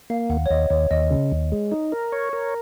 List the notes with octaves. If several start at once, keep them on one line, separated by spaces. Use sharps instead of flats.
A#3 F5
D#2 F#5
C#5
D#2 D#5
D#2 C#5
D#2 D#5
C#3
D#2
G#3
D#4
A#4
C#5
A#4